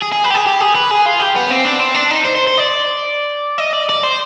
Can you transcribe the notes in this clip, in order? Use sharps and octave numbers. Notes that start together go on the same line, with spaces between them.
G#4
G#4
B4
G4
G#4
G4
G#4
B4
G#4
F4
G4
B3
C4
D4
C4
D4
D#4
C5
C5
C5
D5
D#5
D5
D5
C5